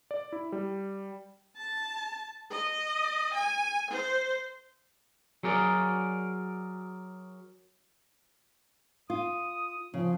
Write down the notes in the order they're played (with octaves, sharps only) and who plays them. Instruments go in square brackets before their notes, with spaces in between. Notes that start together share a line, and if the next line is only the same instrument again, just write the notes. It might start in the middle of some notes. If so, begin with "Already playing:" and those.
[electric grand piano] D5
E4
G3
[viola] A5
D#5
G#5
C5
[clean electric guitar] F#3 G#4 A#4 D5
[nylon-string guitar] F4 [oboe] D#6
[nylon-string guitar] C#3 [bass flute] F3